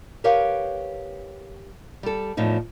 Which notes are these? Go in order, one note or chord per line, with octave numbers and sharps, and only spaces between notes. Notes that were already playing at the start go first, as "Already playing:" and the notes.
G4 A#4 B4 C#5 F5 G5
G3 A4
E2 A2 F3 D#4